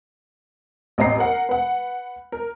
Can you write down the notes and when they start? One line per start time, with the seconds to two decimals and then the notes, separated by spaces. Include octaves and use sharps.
0.98 A1 C4 D#5 A#5 C7
1.18 A#4 F#5 A#5
1.49 B4 F#5
2.32 A#4